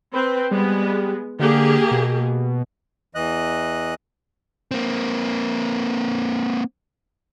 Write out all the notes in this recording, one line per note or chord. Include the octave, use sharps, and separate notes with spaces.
C4 B4
G3 G#3 B3
D3 A#3 G4 G#4
B2
E2 E3 D#5 F#6
A#3 C4